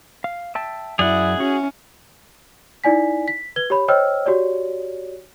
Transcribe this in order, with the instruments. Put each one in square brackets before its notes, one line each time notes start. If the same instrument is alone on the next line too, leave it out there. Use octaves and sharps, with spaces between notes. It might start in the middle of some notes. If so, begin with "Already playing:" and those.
[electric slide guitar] F5
E5 G5 A5
[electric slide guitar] F#2 D5 [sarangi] E4 [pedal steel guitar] G#4 F#5
[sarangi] C#4 [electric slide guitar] F#4
[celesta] D#4 E4 D5 G#5 B6
B6
B4 G#6 G7
G4 C#5 B5
C5 C#5 D#5 G5 E6 F6
F#4 G4 C#5 D5